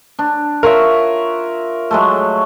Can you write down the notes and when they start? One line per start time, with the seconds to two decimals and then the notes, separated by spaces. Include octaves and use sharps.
0.19 D4
0.63 F4 A#4 C#5 E5
1.91 F#3 G#3 A3